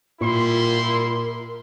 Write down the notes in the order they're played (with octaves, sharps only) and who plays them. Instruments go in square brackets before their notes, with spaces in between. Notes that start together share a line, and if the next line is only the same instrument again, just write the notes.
[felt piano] A#2 [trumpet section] G3 E4 C6 [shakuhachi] F4 [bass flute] A#4